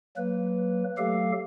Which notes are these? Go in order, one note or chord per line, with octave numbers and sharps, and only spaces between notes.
F#3 A#3 B4
F#3 A3 G4 A4 F5